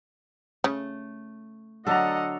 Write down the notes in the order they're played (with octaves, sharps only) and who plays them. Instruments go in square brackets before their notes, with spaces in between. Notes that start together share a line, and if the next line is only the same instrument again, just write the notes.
[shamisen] C#3 [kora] A3
[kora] D3 F#3 D4 [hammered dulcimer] A4 A#5 [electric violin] D#5 F#5